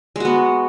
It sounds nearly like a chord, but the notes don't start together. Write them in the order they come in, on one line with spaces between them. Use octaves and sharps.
G#3 F#4 B3